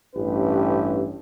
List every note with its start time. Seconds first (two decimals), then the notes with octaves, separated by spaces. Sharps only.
0.15 A1 G2 C#4 G4 B4